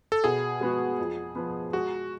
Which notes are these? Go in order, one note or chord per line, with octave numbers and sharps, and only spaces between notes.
A4
B2 G#4
G#3 B3 F#4
F2
F3 B3
G#3 F#4